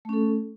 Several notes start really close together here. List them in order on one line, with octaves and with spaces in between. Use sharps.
A3 C#4 A4